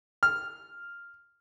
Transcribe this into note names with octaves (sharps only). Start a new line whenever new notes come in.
F6